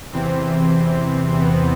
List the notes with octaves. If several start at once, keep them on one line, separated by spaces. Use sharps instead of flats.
E2 C3 E3 C4
B3